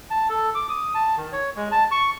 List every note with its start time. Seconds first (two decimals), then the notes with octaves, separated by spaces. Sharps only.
0.11 A5
0.29 A4
0.55 D6
0.69 D#6
0.95 A5
1.17 D#3
1.32 C#5
1.57 G#3
1.72 A5
1.91 C#6